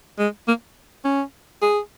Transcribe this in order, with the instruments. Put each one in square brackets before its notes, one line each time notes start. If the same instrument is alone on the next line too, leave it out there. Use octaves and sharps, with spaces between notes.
[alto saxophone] G#3
A#3
C#4
G#4